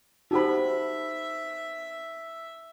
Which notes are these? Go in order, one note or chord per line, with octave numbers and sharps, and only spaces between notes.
D#4 F#4 G4 A4 C5 E5 B5